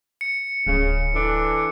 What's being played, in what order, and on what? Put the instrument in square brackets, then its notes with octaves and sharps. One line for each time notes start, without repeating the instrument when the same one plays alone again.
[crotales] C#7
[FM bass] D1 [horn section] C#3
[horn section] E3 D4 A4